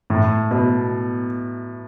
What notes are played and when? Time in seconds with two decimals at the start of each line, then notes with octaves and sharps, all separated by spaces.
0.10 A2
0.51 B2